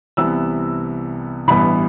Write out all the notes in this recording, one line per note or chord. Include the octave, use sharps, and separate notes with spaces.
C2 C3 E3 B3 E6
A1 G2 E3 B3 B5